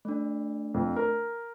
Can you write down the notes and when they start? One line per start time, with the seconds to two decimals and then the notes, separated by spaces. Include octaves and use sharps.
0.05 A3 D4
0.74 F2
0.96 A#4